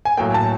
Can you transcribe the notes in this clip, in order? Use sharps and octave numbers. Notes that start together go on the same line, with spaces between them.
G#5
A2 F#3 A#3 G5
A5